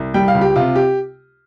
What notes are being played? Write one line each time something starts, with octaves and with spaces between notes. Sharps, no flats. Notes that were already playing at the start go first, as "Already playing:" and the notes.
Already playing: C2
G3 G5
F5
C#2
G4
C3 F4
G4